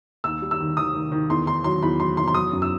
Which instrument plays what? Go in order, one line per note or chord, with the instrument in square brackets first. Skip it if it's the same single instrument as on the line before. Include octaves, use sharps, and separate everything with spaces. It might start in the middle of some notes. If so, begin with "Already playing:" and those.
[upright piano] D#2 E6
G3
E6
D#3
D#3 D#6
D#3
D#3
E2 C6
D#3 C6
F#3 C6
E2 B5
F#3 C6
E2 C6
C6
F#3 D#6
F#2
E6